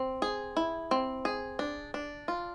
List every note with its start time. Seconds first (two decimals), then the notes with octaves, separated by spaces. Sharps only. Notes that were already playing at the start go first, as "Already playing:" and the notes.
Already playing: C4
0.22 G#4
0.57 E4
0.91 C4
1.25 G#4
1.59 D4
1.94 D4
2.28 F4